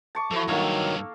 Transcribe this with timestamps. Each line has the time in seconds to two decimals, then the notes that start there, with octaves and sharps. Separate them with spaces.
0.15 A5 C#6 D6
0.31 F3 E4 F#4 A4
0.48 G2 D#3 F#3 A#3 A4 C#5 F5